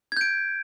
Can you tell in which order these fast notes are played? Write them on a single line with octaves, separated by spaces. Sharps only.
G#6 G6 D7